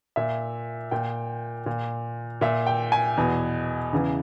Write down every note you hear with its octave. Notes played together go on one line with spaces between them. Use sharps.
A#2 E5
A#2 G5
A#2
A#2 E5
G5
G#5
E2 B2
E2 C#3 E3